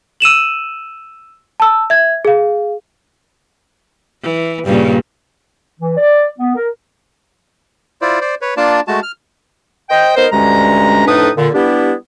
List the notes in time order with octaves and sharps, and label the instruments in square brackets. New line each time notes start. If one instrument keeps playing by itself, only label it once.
[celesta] E6 D#7 E7 F#7
A5 E6
E5 G#6
G#4 F5
[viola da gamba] E3
G2 A#2 C#3
[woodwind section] E3
D5
B3
A#4
[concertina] E4 F4 C5 D5
C5 D5
B4 C#5
A#3 D4 F4 D5 A5
G#3 A3 F#4 A5
F6
[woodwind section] C5 D#5 G5
B3 D#4 A#4 C5
D2 G2 G#3 C#4 A#5
F2 A2 D4 D#4 B4 D#6
A#2 D3
G3 B3 D4 E4 G4